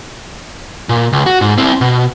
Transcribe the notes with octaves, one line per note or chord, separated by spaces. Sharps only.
A#2
C#2
F#4
G#2
C4 E4
B2